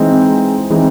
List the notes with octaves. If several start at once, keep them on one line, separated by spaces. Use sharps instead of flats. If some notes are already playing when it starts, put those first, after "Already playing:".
Already playing: E3 G#3 C4 D#4
E3 G#3 C4 D#4